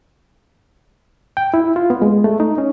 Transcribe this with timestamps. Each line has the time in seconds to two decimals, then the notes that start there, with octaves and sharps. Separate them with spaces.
1.37 G5
1.54 E4
1.76 F4
1.90 B3
2.02 G#3
2.24 A3
2.40 D#4
2.58 C#4